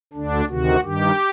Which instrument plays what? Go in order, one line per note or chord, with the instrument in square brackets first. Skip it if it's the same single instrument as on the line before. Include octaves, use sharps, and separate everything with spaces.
[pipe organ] D2 D3 D4
D2 C3 D#3 F#4
G2 D#3 G4